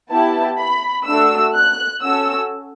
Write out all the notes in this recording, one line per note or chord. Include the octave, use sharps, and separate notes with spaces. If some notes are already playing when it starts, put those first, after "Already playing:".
B3 E4 G4 A5
B5
A3 D4 F#4 A4 E6
F#6
C#4 F#4 A4 E6